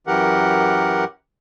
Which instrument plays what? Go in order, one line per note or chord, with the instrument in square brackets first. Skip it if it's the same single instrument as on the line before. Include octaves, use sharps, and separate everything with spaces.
[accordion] F#2 E3 G4 A#4 F#5